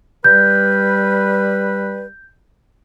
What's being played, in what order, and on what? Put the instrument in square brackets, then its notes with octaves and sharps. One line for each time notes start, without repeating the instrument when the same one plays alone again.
[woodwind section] G3 B4 [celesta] G6